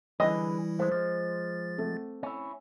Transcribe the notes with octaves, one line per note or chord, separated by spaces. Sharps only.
D3 E3 G3 E4 G#4 B4 D#5
G#3 A3 C5
F3 G#3 A6
A3 C4
C#4 E4